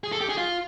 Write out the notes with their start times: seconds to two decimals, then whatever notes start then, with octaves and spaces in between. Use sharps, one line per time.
0.04 G#4
0.12 A4
0.21 G4
0.29 G#4
0.38 F4